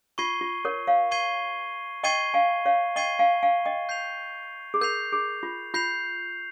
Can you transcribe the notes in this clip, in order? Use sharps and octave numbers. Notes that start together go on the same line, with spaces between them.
F4 C#6 G#6 C7 D#7 G7
F4
A#4 C#5
C#5 F5
C#6 G#6 C7 D#7 G7
D#5 G5 C#6 G#6 C7 D#7 G7
F5 G#5
C#5 F5
D#5 G5 C#6 G#6 C7 D#7 G7
F5 G#5
F5 G#5
D#5 G5
G6 C7 F7
G#4
A#4 G6 C7 F7
G#4
F4
F4 G6 C7 F7